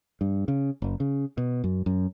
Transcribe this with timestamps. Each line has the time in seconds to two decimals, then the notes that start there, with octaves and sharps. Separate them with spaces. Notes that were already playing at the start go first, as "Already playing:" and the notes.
0.21 G2
0.48 C#3
0.82 F#1
1.00 C#3
1.38 B2
1.64 F#2
1.86 F#2